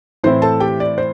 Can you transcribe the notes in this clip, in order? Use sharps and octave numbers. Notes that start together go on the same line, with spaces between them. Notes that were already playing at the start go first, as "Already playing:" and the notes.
A2 E3 C4 E4 C5 C6
A4 A5
G4 G5
D5
C5